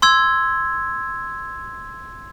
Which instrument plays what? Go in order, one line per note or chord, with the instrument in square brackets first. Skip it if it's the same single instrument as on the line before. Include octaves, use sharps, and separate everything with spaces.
[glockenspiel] C6 E6 G#6